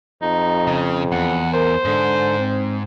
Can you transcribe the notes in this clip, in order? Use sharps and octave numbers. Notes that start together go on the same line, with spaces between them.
F2 D#4
C#3
E2 F#5
A#4 C5
G#2 D3
C4